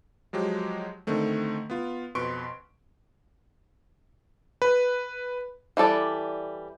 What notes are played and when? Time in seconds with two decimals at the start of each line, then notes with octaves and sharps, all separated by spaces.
0.33 F3 F#3 G#3 G4
1.07 D3 D#3 A3 C4
1.70 B3 F4
2.15 F2 B2 B4 C6 C#6 D7
4.62 B4
5.77 E3 G3 A4 D5